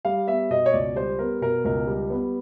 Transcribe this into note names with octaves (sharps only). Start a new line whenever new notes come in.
G3 F5
B3 E5
B2 D#5
C#5
C#2 D5
G3 C5
B3 A#4
B2 A#4
C#2 A#4
G3
B3